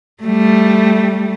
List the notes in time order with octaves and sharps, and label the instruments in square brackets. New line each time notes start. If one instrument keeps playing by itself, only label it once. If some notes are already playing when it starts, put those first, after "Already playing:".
[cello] G3 A3